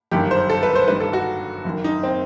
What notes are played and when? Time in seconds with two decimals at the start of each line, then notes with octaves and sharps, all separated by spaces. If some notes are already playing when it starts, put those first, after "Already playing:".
0.11 G1 F#2 D#3 G4
0.31 C5
0.50 A4
0.63 B4
0.75 C5
0.88 G1 G2 D#3 B4
1.00 A4
1.13 F#4
1.64 F#1 F#2 D#3
1.84 D#4
2.03 C4